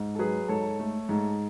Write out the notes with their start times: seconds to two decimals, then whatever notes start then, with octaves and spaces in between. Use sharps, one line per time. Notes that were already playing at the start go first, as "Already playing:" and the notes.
Already playing: G#2
0.15 A4
0.19 F#3 G#4 B4
0.48 G#2 A4 C#5
0.79 A3
1.09 G#2